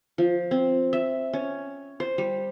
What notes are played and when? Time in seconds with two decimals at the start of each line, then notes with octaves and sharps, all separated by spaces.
0.18 F3
0.51 C4
0.93 E5
1.33 C#4
2.00 C5
2.18 G3